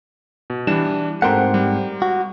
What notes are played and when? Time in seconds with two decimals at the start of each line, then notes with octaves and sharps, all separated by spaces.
0.50 B2
0.67 E3 G3 D4 E7
1.22 G#2 A3 C4 G4 A#4 C5 F#5
1.54 G3
2.02 F#4